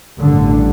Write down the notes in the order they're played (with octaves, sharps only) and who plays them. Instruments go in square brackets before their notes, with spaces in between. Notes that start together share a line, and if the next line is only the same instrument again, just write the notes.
[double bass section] A1 G2 D3